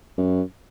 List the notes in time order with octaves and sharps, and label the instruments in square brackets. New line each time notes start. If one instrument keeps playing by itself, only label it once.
[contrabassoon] F#2